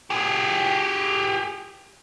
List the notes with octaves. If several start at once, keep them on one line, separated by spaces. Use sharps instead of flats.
G4 G#4